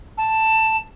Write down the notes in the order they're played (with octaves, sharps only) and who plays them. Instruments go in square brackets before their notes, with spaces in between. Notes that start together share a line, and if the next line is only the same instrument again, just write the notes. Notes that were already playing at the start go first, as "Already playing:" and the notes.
[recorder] A5